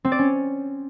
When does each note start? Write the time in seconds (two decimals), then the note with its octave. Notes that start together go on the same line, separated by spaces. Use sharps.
0.05 C4
0.12 D5
0.19 C#4